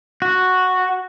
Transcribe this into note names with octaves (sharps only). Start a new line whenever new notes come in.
F#4